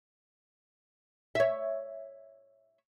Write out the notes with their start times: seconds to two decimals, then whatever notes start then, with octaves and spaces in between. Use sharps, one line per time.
1.35 C#5 E5